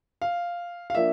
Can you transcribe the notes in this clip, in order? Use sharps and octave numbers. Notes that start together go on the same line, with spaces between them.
F5
F5
F3 A#3 D4 E5